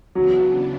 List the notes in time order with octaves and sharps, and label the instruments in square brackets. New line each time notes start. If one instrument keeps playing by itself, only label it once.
[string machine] C#3 E3 B3 D4 [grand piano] F#3